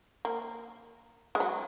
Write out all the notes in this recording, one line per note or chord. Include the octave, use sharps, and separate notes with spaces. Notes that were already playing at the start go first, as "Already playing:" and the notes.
A#3
G#3
F#3